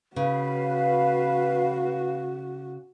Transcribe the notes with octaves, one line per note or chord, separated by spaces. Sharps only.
C#3 F#4 B4 F5